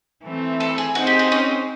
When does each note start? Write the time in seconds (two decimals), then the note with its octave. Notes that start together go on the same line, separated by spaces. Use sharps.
0.23 E3 A3 C4
0.60 A4
0.78 G#4
0.95 C4 D#4 F#4 G#4 C5
1.07 G4
1.19 F#4
1.32 C#4